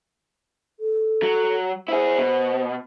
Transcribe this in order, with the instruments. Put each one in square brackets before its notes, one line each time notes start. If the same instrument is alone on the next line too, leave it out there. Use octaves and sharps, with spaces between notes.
[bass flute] A4
[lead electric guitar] F#3
[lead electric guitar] E4 G#4 [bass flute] C5
[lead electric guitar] B2